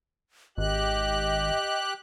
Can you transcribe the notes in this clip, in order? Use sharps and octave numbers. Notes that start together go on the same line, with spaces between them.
G#1 G4 D#5 F#6